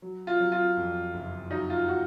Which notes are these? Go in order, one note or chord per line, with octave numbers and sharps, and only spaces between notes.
F#3
F4
F#3
F4
F2
F#1
F#3 D#4
F4
F#4